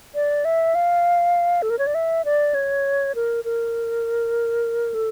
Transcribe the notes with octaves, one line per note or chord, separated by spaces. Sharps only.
D5
E5
F5
A4
A#4
C#5
D5
E5
D5
C#5
A#4
A#4
A4